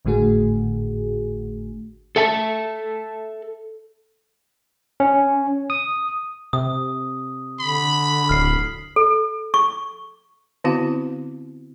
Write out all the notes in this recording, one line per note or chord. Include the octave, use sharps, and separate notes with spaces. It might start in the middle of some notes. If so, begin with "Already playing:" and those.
G#1 A2 D3 A3 F#4 G#4
A4 E5 A5
C#4
D#6
C3 D#6
D3 B5
D1 F6 C7
A4
C#6
D3 B3 C4 E4 F#4 F5